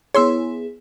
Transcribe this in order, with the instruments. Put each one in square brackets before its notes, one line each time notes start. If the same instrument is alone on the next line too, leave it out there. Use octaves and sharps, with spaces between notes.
[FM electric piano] B3 E4 G#4 [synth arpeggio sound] C#5 C6 E6